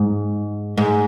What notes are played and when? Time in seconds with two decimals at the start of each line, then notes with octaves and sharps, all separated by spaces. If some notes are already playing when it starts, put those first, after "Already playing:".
Already playing: G#2
0.78 G#2